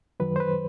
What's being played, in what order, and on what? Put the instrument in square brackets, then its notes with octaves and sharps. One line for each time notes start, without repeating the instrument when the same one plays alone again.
[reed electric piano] F#2 D#3 F#3 B4
C5
B4